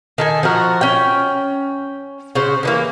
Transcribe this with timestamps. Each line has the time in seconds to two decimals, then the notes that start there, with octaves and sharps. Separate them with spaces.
0.18 D#3 A4 G#5
0.43 F3 F#4 A#4
0.81 C#4 G5
2.35 C#3 F#4 C5
2.63 D3 E3 A#3